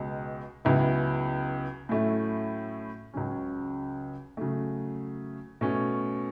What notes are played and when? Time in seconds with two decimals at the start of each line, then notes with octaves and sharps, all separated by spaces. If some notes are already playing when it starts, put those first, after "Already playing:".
Already playing: C#2 B2 G#3
0.65 C#2 C#3 F#3 B3 E4
1.89 A2 F#3 A3 C#4 E4
3.14 C#2 C#3 F#3 C#4
4.37 C#3 F#3 A3
5.61 B2 A3 C#4